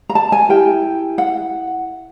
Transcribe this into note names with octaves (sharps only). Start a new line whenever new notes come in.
A#5
A5
G#5
E4 G4 A#4 G5
F#5